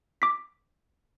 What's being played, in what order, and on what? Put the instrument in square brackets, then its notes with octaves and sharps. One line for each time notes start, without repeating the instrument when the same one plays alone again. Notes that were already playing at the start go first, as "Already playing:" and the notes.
[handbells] D6 B6